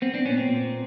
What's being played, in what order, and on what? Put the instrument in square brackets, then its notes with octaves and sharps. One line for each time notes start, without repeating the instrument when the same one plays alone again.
[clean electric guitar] B3 C4
C4 D4
A#2 B3 C#4
C4
A#2